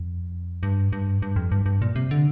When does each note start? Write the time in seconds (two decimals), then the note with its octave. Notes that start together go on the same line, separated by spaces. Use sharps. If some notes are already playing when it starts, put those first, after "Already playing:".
Already playing: F2
0.63 G2
0.93 G2
1.22 G2
1.36 F2
1.52 G2
1.66 G2
1.82 A#2
1.96 C3
2.11 D3